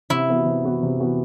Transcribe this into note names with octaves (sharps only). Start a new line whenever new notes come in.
C3 E4
E3 B3 F#4
C3
E3 B3 F#4
C3
E3 B3 F#4